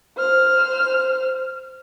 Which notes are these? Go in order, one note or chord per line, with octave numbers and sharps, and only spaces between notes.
C5 F6